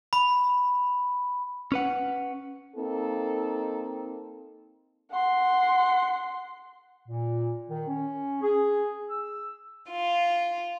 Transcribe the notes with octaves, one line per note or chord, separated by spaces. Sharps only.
B5
C#4 B4 F#5
A#3 C4 D#4 A4
F#5 C6
A#2
D#3
C#4
G#4
E6
F4